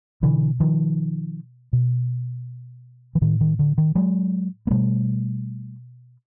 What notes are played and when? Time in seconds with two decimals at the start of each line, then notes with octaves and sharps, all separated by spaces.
0.22 B2 D3 E3
0.60 D#3 F3
1.73 B2
3.15 E3
3.21 A2 D#3
3.41 D#3
3.59 D3
3.78 D#3
3.95 F#3 G#3
4.67 A#3
4.70 B2 G3 A3